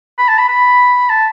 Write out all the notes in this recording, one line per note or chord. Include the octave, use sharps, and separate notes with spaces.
B5
A5
B5
B5
A5